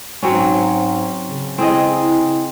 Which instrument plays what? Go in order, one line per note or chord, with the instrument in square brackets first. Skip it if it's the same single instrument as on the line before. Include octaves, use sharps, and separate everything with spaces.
[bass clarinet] G#2 [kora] F#3 C4 C#4
[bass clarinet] C#3
[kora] C4 G#4 D#5 [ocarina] E4